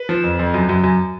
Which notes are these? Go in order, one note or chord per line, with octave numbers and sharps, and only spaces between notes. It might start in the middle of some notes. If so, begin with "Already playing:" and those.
Already playing: B4
F3
F2
F2
F#2
F#2
F#2